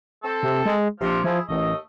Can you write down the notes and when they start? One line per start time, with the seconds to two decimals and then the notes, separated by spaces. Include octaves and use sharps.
0.24 C4 A4
0.43 C3
0.65 G#3
1.01 A#1 C3 F3
1.24 F3 E4 G#4
1.49 A1 D#2 A3 D#5